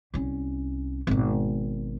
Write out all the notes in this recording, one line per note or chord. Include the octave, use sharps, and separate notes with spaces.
C2 C#4
G#1 B2